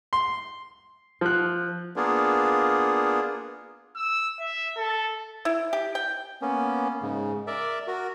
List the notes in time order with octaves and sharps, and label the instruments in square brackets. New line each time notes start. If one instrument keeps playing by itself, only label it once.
[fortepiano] C6
F3 F#6
[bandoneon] A#3 B3 D4 F4 G#4
[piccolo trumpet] E6
E5
A4
[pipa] E4
G4
G5
[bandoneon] A#3 B3 C#4
G#2 C#3
A#4 D5 E5
F#4 A#4